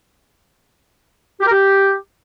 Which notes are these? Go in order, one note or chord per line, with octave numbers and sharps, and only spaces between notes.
G4
A#4
G4